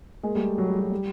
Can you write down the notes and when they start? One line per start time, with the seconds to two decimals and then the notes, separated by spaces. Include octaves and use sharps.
0.23 G#3 A#3
0.35 G3 A3
0.58 F#3
0.68 G3
0.79 F#3
0.91 G3